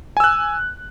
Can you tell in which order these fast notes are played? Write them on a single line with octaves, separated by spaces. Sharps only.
G#5 E6 F#6